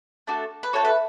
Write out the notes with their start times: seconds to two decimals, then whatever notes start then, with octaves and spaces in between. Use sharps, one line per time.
0.27 A3 D4 F#4 A4
0.63 B4
0.73 A3 D4 F#4 A4 C#5
0.85 B4